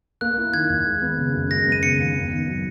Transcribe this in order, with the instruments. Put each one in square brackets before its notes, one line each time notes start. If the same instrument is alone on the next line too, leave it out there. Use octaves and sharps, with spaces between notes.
[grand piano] A#3 [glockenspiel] F#6
[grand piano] E4
[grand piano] D#3 [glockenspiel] G#6
[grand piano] D#2
G#3
B3
C#3
F#2
[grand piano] G#3 [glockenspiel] A#6
[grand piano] B3
[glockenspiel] D#7
[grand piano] C#3 [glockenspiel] C#7
[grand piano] D#2
B3
D#3
F#3